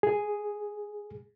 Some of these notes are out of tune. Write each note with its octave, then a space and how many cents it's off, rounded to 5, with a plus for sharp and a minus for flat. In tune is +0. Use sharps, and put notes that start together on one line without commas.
G#4 +0